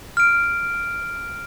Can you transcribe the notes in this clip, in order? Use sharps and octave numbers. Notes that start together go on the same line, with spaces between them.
F6 D7